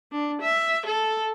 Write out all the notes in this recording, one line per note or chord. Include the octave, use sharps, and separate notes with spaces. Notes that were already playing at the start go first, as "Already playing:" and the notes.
D4
E5
A4